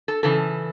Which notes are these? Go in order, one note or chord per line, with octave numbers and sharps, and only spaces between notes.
A4
C#3 E3 A4